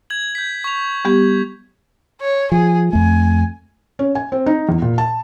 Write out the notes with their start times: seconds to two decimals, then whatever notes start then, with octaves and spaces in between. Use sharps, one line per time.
0.10 G#6 F#7
0.35 G6 B6
0.64 C#6 F7
1.05 G3 B3 G4
2.21 C#5
2.52 F3 G#4
2.93 F2 A3 G#5
3.99 C#4
4.15 G#5
4.32 C4
4.46 D#4
4.69 E2
4.82 A#2
4.98 A5